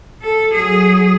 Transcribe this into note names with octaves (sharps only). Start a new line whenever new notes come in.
A4
F#3 G#4